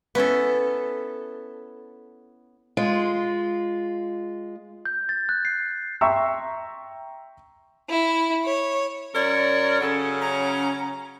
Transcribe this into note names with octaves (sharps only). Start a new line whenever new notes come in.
B3 C#4 E4 A4
G#3 F4
G6
A6
F#6
C7
E5 G5 A#5 C6 C#6 E6
E4
C#5
F#2 A#4 C#5 D5
C#3 F#3 C#4 A4
A#5